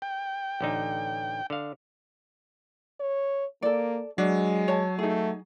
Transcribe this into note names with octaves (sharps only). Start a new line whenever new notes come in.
G5
A1 D3 D#4
D3 F5
C#5
A#3 A4 D5
F#3 G#3 D4
C#5 A5
A3 D#4 G#4